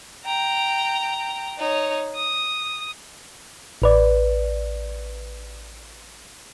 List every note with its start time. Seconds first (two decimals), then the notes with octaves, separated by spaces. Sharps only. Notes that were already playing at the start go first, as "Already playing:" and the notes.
0.24 G5 A#5
1.58 D#4 C#5
2.16 D#6
3.82 A1 B4 D5